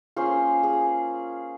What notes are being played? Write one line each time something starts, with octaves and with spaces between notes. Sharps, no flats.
A#3 C#4 F4 G#4 C5
G#4